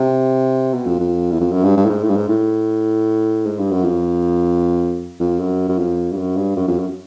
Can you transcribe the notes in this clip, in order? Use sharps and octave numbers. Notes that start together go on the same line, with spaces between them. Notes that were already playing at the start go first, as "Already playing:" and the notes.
Already playing: C3
B2
F2
F2
E2
F2
F#2
G2
G2
A2
G#2
A2
G2
G#2
A2
G#2
G2
F#2
F2
F2
F#2
F#2
F2
G2
F#2
G2
F#2
F2
F#2